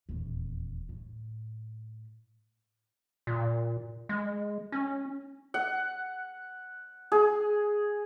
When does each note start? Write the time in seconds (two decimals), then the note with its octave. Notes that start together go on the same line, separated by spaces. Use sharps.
0.09 D#1 E2
0.89 A2
3.27 A#2
4.09 G#3
4.72 C#4
5.54 F#5
7.12 G#4